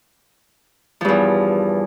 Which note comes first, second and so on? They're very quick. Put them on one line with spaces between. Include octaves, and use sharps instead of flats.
F3 G2 E2